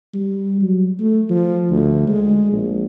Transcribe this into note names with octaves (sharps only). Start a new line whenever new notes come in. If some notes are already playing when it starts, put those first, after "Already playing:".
G3
F#3
A3
F3
D2
G#3
A#1